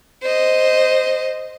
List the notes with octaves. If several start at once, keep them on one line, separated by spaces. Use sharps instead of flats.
C5 D#5